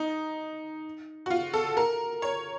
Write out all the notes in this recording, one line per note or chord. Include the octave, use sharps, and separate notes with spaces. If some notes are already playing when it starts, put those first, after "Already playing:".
Already playing: D#4
F#4
F4
A4
A#4
C#5